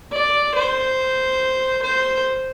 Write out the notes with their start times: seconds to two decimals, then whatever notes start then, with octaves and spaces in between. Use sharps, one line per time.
0.13 D5
0.55 C5
1.84 C5